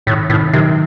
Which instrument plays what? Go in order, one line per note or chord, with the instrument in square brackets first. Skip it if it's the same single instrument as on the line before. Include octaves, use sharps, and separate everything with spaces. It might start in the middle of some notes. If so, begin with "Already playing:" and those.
[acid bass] A2 [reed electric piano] C3 D#3
[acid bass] A2 [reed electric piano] C3 D#3
[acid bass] C3 [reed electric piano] D#3 F#3